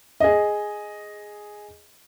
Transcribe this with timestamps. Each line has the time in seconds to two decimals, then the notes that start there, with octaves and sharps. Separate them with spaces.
0.20 G#4 D#5